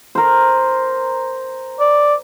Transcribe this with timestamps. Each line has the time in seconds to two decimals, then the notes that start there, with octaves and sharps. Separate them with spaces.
0.15 A#4 C5
1.80 D5